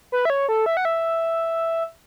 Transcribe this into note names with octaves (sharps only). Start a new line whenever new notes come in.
B4
E5
C#5
A4
E5
F#5
E5